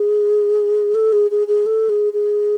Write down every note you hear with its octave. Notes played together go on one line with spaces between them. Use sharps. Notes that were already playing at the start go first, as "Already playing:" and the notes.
Already playing: G#4
A4
G#4
G#4
G#4
A4
G#4
G#4